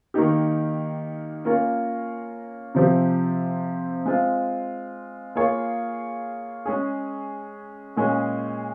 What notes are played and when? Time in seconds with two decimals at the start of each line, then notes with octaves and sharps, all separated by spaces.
0.14 D#3 A#3 D#4 G4
1.45 A#3 C#4 F4 A#4 C#5
2.75 C3 F3 C4 G4
4.06 G#3 C4 F4
5.35 A#3 F4 G#4 C#5 F5
6.66 G#3 C#4 G#4
7.97 A#2 G#3 C#4 G#4